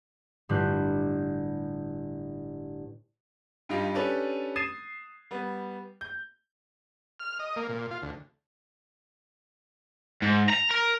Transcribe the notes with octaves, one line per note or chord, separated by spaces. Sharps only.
G1 A2 G3 F4 F#6 G6
G2 G3 D#4 F4 G4
C#4 D4 G4 A4 B4 B5
D#6 G#6 A6 C7 D#7 E7
G3 B3
G6
F6
D#5
A#3
A#2
F4
D2
G#2
A#5
A#4